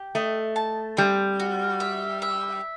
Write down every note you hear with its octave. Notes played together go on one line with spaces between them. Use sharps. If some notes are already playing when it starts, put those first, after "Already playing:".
Already playing: G4
A3 D#5
A5
G3 C4
F#4
E5
E5